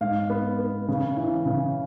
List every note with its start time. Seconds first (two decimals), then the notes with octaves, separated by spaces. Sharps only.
0.01 G#2 F5
0.30 B3
0.59 B3
0.88 C#3
1.17 E3
1.46 C#3